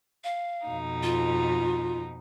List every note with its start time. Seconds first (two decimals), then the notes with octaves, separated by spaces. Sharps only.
0.24 F5
0.68 F2 B2 D#4
1.03 F4